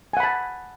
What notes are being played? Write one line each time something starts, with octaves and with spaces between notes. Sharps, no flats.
F#5 G#5 A5 B5